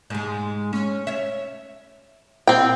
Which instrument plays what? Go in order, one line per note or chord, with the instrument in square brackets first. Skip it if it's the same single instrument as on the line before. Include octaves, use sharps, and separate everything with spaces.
[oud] G#2 G#3
C#4
C#5 E5
[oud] A#2 [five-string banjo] C4 G5